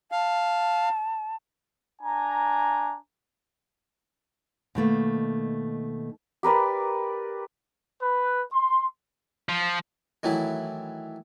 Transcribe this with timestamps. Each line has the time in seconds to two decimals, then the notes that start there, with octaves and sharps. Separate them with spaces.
0.12 F5 A5
2.01 D4 G#5 A#5
4.75 B2 D#3 A3 A#3
6.43 G4 A#4 B4 D5
8.00 B4
8.53 C6
9.49 F3
10.23 D#3 E3 F#3 A3 E4